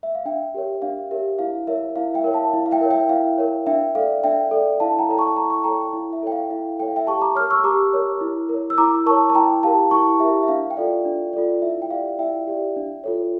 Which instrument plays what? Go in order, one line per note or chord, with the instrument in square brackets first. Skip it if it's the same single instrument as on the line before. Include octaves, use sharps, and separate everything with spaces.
[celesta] E5
F5
D4 E5 G5
G4 A#4 C#5
D4 F5
G4 A#4 C#5 E5
E4 F5
A#4 C#5 E5
E4 F5
E5 G5
A#4 C#5
F5 A5
E4
F5
E5 G5
A#4 C#5
E5 G5
E4 F5
A#4 C#5
D4 E5 G5
A4 D5 F5
D4 E5 G5
A4 D5
E4 F5 A5
G5 A#5
A4 C#5 A#5
A5 C#6
E4 A#5
C#6
A4 C#5 G5 A#5
E4
E5
A4 C#5 G5
F5
E4 F5
A4 C#5 G5
F5
E5 G5
G4 A5 C#6
A#5 D6
A#4 C#5 D6 F6
C#6 E6
G4 A#5 D6
A#4 C#5
E4
A#4
C#5
E6
E4 A#5 D6
A#4 C#5 A5 C#6
A5
E4 G5 A#5
G4 A#4 F5 A5
E4 A5 C#6
G4 A#4 E5
E5
D4 F5
G5
F4 A4 D5 F5
D4
F4 A4 D5
E4 E5
G5
G4 D5 F5
E4 E5 G5
G4 D5
D4
F4 A4 C#5